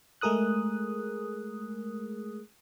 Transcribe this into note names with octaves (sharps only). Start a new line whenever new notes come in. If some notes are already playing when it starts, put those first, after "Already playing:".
G#3 A3 G#4 A#4 D#6 F#6